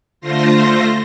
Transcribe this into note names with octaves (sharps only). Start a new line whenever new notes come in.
D3 A3 F4 C5 C6 A#6